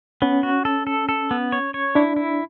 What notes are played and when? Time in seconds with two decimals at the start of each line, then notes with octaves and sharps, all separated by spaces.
0.22 B3 C#4
0.43 F#4
0.65 A4
0.87 A4
1.09 A4
1.31 B3
1.52 C#5
1.74 C#5
1.95 D4 E4
2.16 E4